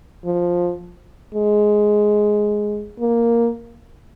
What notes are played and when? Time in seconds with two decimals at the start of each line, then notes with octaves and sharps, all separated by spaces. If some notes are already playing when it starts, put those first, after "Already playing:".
0.25 F3
1.35 G#3
3.00 A#3